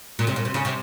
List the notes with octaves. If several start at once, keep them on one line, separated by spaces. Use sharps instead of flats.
A#2
C3
A#2
C3
C#3
C3